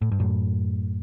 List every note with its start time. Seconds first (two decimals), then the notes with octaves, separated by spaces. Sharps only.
0.02 A2
0.12 G2
0.20 F#2 A2